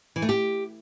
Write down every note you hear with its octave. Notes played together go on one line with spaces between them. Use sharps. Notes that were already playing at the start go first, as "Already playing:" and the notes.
E3
A3
G4